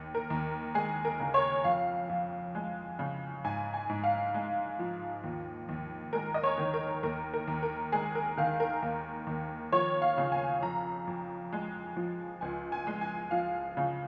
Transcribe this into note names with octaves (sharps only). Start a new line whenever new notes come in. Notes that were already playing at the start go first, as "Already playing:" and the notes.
Already playing: D#2
A#4
D#2
G#3 G#4
A#4
C#3
C#5
F2 F5
F2
G#3
C#3
G#2 G#5
G#5
G#2
F5
G#3
F3
D#2
D#2
G#3 A#4
D#5
C#5
D#3
A#4
D#2 A#4
A#4
D#2
A#4
G#3 G#4
A#4
D#3 F5
A#4
D#2
D#2
F3 C#5
F5
C#3
G#5
F2 A#5
F2
G#3
F3
C#2 G#5
G#5
G#3
G#5
F3 F5
C#3